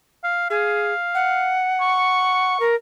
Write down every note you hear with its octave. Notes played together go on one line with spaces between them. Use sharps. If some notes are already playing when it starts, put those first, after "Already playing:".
F5
G#4 F5
F#5
C#6
A#4